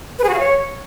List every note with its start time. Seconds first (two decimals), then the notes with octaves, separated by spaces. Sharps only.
0.19 B4
0.24 G#4
0.29 F#4
0.34 F5
0.39 C#5